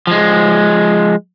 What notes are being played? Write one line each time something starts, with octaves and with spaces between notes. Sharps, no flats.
F3 G#3